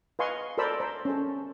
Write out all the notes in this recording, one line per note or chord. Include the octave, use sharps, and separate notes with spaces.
B4 D#5 F5 G#5 C6 C#6
A4 A#4 C5 D5 B5 E6
C5 A#5
C#4 A4